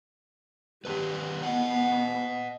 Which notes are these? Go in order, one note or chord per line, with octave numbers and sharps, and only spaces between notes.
D#3 G3 G4 B4
B3 D#5 F#5